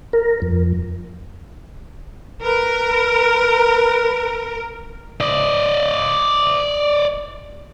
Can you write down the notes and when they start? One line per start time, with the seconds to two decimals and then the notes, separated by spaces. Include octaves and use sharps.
0.13 A#4
0.42 F2
2.43 A#4 B4
5.20 D5 D#5